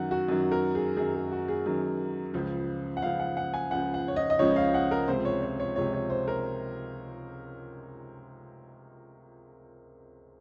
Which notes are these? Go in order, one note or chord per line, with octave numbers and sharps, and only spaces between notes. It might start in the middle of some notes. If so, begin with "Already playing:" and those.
Already playing: F#2 D#3 F#3 F#5
F#4
F#2 D#3 F#3
A#4
G#4
F#2 D#3 F#3 G#4
G#4
F#4
G#4
F#2 D#3 F#3
C#2 C#3 F3
F#5
C#2 C#3 F3 F5
F#5
F#5
G#5
C#2 C#3 F3 F#5
F#5
C#5
D#5
D#5
C#2 C#3 F3 C#5
F5
F#5
A#4
C#2 C3 F3 G#3 C5
C#5
C#5
C#5
C#2 C3 F3 G#3 C#5
C#5
C5
A#4